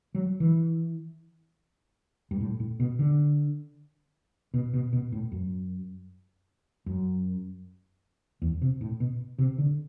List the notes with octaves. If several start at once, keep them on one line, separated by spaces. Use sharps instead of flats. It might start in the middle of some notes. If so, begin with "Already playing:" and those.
F#3
E3
G2
A2
A2
B2
D3
B2
B2
B2
A2
F#2
F#2
E2
C3
A2
B2
C3
D3